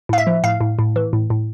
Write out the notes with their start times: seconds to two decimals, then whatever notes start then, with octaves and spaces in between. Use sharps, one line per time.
0.09 A2 F5
0.18 E5
0.27 F3
0.44 A2 F5
0.61 A2
0.79 A2
0.96 E3
1.13 A2
1.30 A2